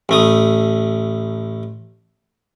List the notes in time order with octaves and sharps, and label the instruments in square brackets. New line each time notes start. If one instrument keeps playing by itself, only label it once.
[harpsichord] A1 A3 D#6